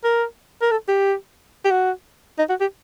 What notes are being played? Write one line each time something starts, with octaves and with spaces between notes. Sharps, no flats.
A#4
A#4
A4
G4
G4
F#4
D#4
F#4
G4